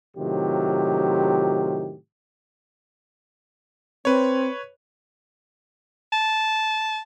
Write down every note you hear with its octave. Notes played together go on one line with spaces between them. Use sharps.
A2 C3 D#3 F#3 F4 G4
C4 B4 C#5
A5